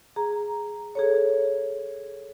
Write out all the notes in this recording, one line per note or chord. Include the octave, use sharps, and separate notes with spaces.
G#4 A#5
G#4 A4 C#5